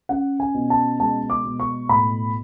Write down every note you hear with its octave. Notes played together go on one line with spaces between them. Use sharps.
C#4 F#5
G#5
B2
A5
G#3 A5
D6
B2
C#6
A2 B5